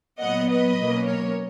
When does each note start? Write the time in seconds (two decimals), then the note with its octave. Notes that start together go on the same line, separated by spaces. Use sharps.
0.20 A#2 F#3 B3 D#5 F#5
0.49 B4 D#5
0.78 B2 F#3 A#3 C#4
1.07 A#4 C#5